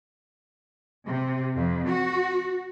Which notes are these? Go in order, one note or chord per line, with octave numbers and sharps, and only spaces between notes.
C3
F2
F#4